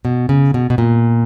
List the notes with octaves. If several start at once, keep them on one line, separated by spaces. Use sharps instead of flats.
B2
C#3
B2
B2
A#2